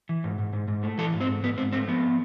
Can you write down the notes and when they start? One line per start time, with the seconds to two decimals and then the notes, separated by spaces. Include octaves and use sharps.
0.09 E3
0.24 G#2
0.39 G#2
0.53 G#2
0.68 G#2
0.83 A3
0.98 E3 A4
1.13 G#2
1.21 C4
1.28 G#2
1.43 G#2 B3
1.58 G#2 C4
1.72 A3 C4
1.87 F3 B3